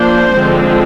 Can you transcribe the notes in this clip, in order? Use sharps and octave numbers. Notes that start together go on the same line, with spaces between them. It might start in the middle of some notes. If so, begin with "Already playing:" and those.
Already playing: F3 A#3 D4 C5
D3 F3 G#3 C4